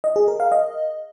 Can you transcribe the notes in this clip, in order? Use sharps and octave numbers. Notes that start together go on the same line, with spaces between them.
D#5
G#4
A#4
F5
D#5